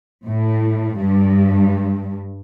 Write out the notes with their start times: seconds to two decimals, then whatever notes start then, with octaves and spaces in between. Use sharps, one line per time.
0.25 A2
0.95 G2